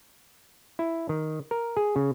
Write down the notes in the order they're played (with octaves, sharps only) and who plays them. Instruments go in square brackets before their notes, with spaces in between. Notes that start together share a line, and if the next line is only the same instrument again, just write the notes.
[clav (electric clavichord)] E4
D#3
A#4
G#4
C#3